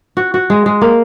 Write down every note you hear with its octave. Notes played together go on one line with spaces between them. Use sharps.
F#4
F#4
G#3
G#3
A#3